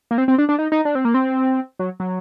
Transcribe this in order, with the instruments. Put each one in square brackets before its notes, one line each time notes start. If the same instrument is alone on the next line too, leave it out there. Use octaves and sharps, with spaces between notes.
[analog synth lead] A#3
C4
C4
D4
D4
D#4
D#4
D4
C4
A#3
C4
F#3
F#3